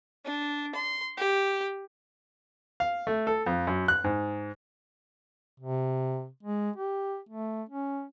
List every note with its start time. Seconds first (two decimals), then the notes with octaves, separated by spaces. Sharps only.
0.25 D4
0.75 C6
1.17 G4
2.80 F5
3.07 A3
3.27 A4
3.47 F2
3.67 F#2
3.88 F#6
4.04 G#2
5.60 C3
6.43 G#3
6.76 G4
7.29 A3
7.69 C#4